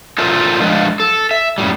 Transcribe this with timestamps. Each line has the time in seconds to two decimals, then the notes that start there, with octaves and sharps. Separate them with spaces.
0.18 F4 A4 A#4 C5 D5 E5
0.60 F3 G#3 D4 F4 B4 D5
1.00 A4
1.31 E5
1.58 F#2 A2 G3